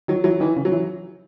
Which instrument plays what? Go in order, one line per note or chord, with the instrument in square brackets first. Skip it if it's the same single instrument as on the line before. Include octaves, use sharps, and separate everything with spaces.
[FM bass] D#3 [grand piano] F#3
[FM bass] E3 [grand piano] F#3
[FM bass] D#3 [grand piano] E3
[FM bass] C#3
[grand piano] F#3
[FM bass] E3